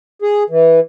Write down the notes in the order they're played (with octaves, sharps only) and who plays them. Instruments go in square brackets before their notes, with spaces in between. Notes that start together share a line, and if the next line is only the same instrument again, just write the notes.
[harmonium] G#4
E3